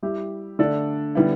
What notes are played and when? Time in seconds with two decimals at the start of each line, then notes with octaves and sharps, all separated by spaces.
0.03 G3 E4 G4 E5
0.59 D3 A3 D4 A4 D5
1.15 D3 G3 B3 E4